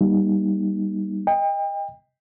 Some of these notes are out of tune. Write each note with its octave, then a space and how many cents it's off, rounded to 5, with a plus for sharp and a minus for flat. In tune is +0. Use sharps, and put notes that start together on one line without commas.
G3 +0 A#3 +35 D#4 +0
D#5 +5 G5 +35